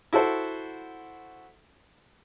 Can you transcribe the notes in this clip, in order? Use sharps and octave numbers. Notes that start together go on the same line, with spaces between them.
E4 F#4 A4 C5